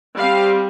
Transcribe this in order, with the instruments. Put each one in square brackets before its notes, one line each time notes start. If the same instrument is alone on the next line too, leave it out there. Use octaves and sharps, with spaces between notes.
[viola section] G3 C4 F5